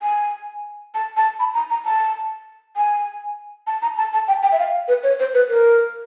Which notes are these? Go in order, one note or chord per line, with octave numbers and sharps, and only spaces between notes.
G#5
A5
A5
B5
A#5
A#5
A5
G#5
A5
A#5
A5
A5
G5
G5
E5
F5
B4
C#5
C5
B4
A#4